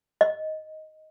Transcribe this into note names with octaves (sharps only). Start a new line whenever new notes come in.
D#5